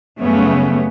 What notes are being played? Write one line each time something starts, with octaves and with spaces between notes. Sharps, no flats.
F#2 C#3 G3 A3 B3 C#4